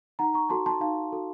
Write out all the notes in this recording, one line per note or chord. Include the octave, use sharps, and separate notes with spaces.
D#4 F#5 A#5
A#5 C#6
F#4 A4 A5 C6
A5 C6
D#4 F5 A5
F#4 A4